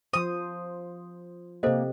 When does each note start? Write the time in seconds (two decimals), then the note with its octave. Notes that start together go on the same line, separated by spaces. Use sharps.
0.13 F3 C5 D#6
1.63 C3 A#3 G4 A4 C5 D#5